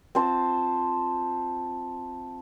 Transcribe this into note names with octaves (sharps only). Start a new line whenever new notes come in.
C4 F4 C5 A5